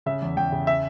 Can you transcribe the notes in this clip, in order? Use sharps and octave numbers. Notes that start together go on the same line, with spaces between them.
C#3 E5
E2
E2 G5
C#3
E5